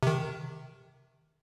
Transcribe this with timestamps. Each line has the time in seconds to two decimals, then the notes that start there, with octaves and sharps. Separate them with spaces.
0.03 C3 D#3